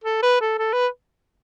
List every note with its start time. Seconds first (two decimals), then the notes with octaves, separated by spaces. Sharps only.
0.04 A4
0.22 B4
0.41 A4
0.59 A4
0.73 B4